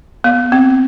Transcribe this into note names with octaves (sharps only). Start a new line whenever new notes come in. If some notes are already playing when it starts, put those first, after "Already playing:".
B3
C4